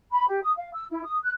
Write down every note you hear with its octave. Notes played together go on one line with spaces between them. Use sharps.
B5
G4
D#6
F5
E6
E4
D#6
F#6